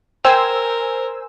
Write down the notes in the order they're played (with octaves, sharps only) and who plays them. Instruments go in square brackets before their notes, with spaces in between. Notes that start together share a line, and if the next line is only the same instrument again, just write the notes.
[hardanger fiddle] A#4 [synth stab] C5 G#5 E6 [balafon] G5